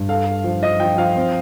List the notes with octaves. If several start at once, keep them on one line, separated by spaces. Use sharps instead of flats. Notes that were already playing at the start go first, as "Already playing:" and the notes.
Already playing: G2
A4 F5
A4
F3
F3 D#5
F3 G5
F3 F5
C4